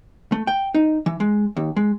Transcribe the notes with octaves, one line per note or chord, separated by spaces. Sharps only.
A3
G5
D#4
E3
G#3
D#2
G#3